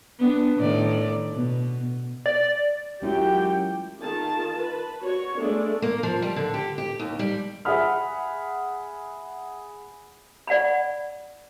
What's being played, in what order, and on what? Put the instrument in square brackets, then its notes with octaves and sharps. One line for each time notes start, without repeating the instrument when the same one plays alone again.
[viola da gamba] B3 D4
A2 D#3 D5
B2
[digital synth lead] D5
[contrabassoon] F#2 [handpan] G#3 E4 F4 [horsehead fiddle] G4 G5
[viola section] D#3 F4 G#4 A5
B4
F#4 C#5
G#3 A3 B3 D4
[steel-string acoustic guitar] A#3
F3
G3
D3
G4
G4
D#2
G3
[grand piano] G#4 E5 F#5 B5 F6
[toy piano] D5 F#5 G#5 B5